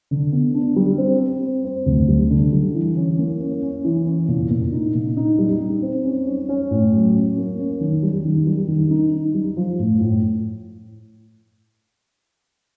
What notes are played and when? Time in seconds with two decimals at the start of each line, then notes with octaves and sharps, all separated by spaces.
0.11 D3
0.32 B3
0.55 D4
0.76 G3
0.98 C4
1.20 C4
1.42 C4
1.65 C4
1.86 D2
2.08 G3
2.31 D3
2.53 G3
2.75 E3
2.97 C#4
3.19 A#3
3.41 C#4
3.63 C#4
3.85 E3
4.06 C#4
4.28 A#2
4.50 A#2
4.73 D#4
4.94 A#2
5.17 D#4
5.39 G3
5.61 D#4
5.82 C4
6.05 C#4
6.27 C#4
6.49 C#4
6.71 A2
6.93 F#3
7.15 C#4
7.37 A#3
7.59 C#4
7.81 D#3
8.03 G3
8.25 D#3
8.47 G3
8.68 D#3
8.90 D#4
9.13 D#4
9.34 G3
9.57 F3
9.79 A2
10.01 A2